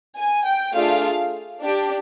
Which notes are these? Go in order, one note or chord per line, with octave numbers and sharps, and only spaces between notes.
G#5
G5
A3 D4 F4 G#4 F5
D4 G4